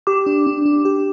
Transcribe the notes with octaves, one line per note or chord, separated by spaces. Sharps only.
G4 D6
D4
D4
D4
G4